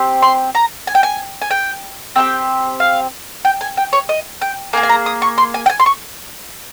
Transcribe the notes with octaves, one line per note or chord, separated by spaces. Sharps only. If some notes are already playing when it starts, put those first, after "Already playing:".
Already playing: C4 G4
C6
A#5
G#5
G5
G#5
G#5
G5
C4 D#4 G4 G5
F5
G5
G#5
G5
C#5
D#5
G5
A#3 F4 G#4 G#5
G#5
A#5
D#6
C#6
C6
G#5
G5
G#5
C6
C#6